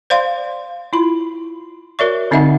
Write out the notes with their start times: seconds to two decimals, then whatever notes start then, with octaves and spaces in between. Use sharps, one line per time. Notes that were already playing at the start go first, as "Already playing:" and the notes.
0.10 C5 D5 F5 C6
0.93 E4 F4 B5
1.99 F#4 A#4 C#5 D5 E5 C#6
2.31 D3 C4 D#4 D#5 E5 F#5